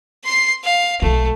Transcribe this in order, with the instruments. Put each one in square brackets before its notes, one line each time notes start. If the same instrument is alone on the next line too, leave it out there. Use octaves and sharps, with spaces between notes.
[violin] C6 C7
F5
[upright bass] B1 G#3 [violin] A3